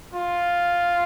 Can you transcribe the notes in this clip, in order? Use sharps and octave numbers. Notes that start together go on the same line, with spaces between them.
F4